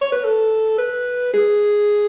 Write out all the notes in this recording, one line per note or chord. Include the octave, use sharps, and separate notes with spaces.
C#5
B4
A4
B4
G#4